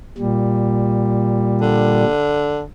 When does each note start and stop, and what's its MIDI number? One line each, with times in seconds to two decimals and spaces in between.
0.18 2.04 46
0.18 2.04 55
1.61 2.63 50